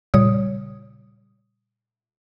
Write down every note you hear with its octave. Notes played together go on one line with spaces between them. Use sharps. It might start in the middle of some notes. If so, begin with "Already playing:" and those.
A#2 C#3 G3 C#5 D#6